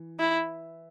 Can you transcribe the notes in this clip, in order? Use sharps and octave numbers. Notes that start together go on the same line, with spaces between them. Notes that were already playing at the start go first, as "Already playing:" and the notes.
Already playing: E3
E4